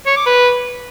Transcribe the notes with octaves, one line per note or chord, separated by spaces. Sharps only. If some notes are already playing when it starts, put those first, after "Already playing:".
C#5
D6
B4